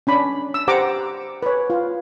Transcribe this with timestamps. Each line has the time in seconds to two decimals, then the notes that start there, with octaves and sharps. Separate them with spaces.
0.07 C#4 D4 B5
0.54 E6
0.68 G4 C5 F#5 A#5 D6
1.43 B4 C#5
1.70 F4